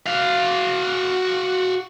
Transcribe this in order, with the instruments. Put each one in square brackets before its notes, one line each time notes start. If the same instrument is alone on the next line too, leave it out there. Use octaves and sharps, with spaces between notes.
[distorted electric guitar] F#4 F5